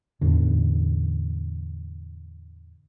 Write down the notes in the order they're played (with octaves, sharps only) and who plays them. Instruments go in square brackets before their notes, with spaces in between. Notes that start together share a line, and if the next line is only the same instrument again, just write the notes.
[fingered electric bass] E2 A2 D3